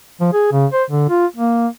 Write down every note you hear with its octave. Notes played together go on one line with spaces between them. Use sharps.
F3
G#4
C#3
C5
D3
F4
A#3